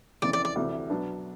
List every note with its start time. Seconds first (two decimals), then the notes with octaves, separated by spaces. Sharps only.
0.22 F2 C#3 E3 D5
0.33 D5
0.45 D5
0.55 D2 C3 E3
0.90 B2 F#3 B3 D4